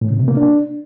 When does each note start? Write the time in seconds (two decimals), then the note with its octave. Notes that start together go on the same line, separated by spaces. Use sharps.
0.01 A2
0.10 C#3
0.19 C3
0.28 A#3
0.37 D4